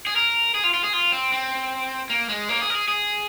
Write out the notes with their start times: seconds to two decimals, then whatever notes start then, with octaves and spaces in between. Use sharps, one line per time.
0.07 G#4
0.16 A#4
0.54 G#4
0.64 F4
0.74 F4
0.84 G#4
0.93 F4
1.12 C4
1.32 C4
2.10 A#3
2.29 G#3
2.49 A#3
2.61 G#4
2.70 A#4
2.75 G#4
2.88 G#4